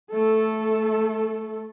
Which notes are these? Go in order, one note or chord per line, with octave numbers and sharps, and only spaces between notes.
A3 A4